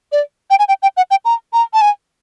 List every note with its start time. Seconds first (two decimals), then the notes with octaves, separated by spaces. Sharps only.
0.12 D5
0.50 G5
0.59 G#5
0.68 G5
0.82 G5
0.97 F#5
1.11 G5
1.25 A#5
1.53 A#5
1.73 A5
1.81 G#5